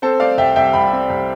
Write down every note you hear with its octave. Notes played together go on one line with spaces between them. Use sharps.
C4 A4 C5
A3 D5 F5
C2 E5 G5
C2 E5 G5
C2 G5 B5
C4
C2